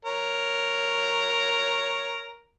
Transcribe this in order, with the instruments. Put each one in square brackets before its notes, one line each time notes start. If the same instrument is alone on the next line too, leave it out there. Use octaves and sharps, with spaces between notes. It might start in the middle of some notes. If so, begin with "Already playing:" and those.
[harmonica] A#4 C#5